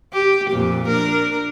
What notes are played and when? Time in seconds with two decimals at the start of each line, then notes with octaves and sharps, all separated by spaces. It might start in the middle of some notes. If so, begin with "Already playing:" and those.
0.13 G4
0.50 F2 A#2
0.88 D4 A#4